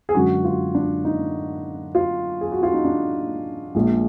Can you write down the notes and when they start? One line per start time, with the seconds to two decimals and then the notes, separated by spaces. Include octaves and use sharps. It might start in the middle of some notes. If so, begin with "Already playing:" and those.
0.09 G#4
0.15 F#2 D3 G#3 F#4
0.44 F4
0.75 D4
1.05 D#4
1.95 F4
2.41 G#4
2.52 F#4
2.63 F4
2.74 D#4
2.85 D4
3.75 A#1 A#2 G#3